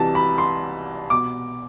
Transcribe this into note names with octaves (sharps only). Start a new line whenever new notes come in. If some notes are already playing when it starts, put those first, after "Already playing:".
Already playing: C2 C3 E3 A5
B5
C6
B2 D6